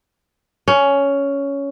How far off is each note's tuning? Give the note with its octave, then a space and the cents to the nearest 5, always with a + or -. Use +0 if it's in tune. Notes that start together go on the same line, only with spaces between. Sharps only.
C#4 +10